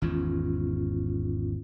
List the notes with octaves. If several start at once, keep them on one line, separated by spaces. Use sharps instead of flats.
G#1 E2 G#2 C#4 F4